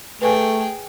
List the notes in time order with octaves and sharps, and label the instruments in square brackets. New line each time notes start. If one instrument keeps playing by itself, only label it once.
[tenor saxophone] A3 [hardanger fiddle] G#4 G5 [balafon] B4 G#5